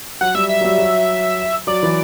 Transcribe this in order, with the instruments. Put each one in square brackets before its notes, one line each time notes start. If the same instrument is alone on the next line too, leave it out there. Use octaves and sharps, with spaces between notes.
[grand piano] F#3 [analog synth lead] F#5
[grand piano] G3 [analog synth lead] E5
[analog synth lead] E5
[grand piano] F#3
G3
F#3
[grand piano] F#3 [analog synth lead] D5
[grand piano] E3